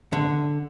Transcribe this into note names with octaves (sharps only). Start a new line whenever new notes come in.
D3